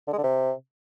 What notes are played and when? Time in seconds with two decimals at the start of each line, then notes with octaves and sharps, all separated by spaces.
0.08 D3
0.13 G#3
0.18 D3
0.23 C3